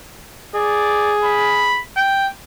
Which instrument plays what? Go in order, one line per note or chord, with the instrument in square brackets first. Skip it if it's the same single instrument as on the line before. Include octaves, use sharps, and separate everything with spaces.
[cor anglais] G#4 [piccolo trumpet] D5
[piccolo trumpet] B5
G5